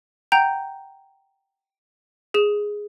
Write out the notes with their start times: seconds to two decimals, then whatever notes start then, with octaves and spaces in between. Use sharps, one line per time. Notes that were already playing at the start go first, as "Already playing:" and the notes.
0.32 F#5 G5 A#5 G6
2.34 G#4 E7